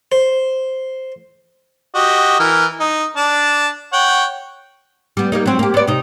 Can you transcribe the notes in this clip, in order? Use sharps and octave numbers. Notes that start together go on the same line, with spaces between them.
C5
F#4 G4 D#5
E3 A#4 F6
D#4
D4 A5
C#5 F#5 G5
G3 B3
G3 A#3 D#4
F#3 C4
A#3 G4
B3 D5
C3 D#4